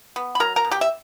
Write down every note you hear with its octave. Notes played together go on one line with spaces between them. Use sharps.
B3
B5
F#3 A#4 A#5
A#4 A#5
B2
G4 G5
E5